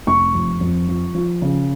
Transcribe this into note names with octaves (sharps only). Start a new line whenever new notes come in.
F1 C#6
F2
F2
F3
F3
C#3